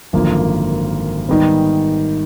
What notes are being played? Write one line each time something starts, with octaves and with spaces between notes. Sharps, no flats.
G#1 F#2 D3 F3 A#3
G#2 D#3 G3 B3